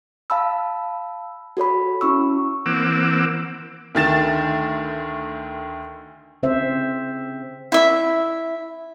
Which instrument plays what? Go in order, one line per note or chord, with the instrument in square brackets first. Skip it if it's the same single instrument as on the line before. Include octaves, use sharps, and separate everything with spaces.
[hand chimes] F5 A5 B5 E6
F#4 A4 C#5 B5
C#4 E4 C#6 E6
[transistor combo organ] E3 A#3 C4 F#5 D6 E6
[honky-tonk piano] D2 D#3 A6 E7
[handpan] C#3 C4 C5 E5
[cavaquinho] E4 E5